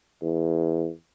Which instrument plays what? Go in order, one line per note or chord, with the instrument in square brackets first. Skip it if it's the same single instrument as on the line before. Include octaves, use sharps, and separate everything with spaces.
[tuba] E2